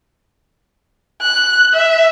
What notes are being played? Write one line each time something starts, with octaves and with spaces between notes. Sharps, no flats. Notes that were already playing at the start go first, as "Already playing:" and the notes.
F#6
E5